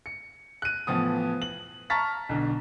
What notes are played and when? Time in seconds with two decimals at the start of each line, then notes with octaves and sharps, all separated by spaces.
0.06 C#7
0.62 F#6 D#7
0.87 A2 E3 F3 B3 D#6
1.42 F#7
1.90 A5 A#5 C#6 F6 A6 B6
2.29 B1 D3